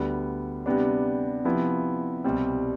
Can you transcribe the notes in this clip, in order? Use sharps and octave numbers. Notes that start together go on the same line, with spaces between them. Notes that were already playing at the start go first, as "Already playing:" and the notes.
Already playing: D2 D3 G3 B3
C3 G3 B3 D4
C3 F3 B3 E4
C2 B2 G3 C4